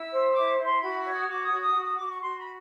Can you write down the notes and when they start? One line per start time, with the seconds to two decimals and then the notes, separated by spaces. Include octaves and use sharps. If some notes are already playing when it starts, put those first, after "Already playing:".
Already playing: E4 E6
0.11 C5
0.34 E4 D6
0.58 E4
0.65 C6
0.81 F#4 B5
1.05 C#5
1.12 D#6
1.28 F#4 D6
1.44 D#6
1.52 F#4
1.60 D#6
1.74 F#4
1.81 D#6
1.95 F#4 D6
2.08 C#6
2.22 F#4 C6
2.38 B5